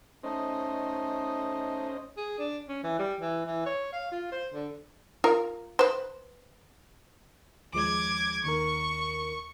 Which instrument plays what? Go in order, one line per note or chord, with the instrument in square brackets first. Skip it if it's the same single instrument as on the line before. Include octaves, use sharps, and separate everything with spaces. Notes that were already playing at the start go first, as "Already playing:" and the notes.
[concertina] A3 D#4 [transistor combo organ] C#4 C5 D#5
[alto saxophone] G#4
D4
C#4
E3
G3
E3
E3
C#5
F5
F4
C5
D3
[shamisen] F4 A#4
B4 C5
[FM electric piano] D#2 F3 G#3 [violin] D6 G#6
[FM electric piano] D#2 D#3 A#4 [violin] C#6